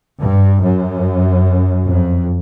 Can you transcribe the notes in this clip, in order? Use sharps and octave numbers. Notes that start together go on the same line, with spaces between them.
G2
F#2
F2